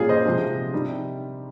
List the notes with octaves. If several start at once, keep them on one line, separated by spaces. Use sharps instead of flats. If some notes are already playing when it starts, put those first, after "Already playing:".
Already playing: A#2 G3 A#3 C#4 F4 G#4
C5 D#5
C3 F3 G#3 C4
C3 D#3 G3